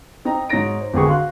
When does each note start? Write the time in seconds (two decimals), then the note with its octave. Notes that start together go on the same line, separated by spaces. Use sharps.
0.25 C4 D#4 G5 A#5
0.49 G#2 D#4 F#4 C#5 A#6 D7
0.81 C5
0.94 G#1 D3 B3 G4 G#4 C#6
1.07 F#4 F5 C6 F#6